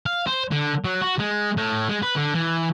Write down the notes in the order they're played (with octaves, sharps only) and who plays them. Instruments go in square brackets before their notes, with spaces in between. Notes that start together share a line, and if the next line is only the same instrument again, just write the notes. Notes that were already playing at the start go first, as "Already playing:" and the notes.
[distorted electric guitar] F5
C5
D3
F#3
F#4
G#3
A2
G#3
B4
D3
E3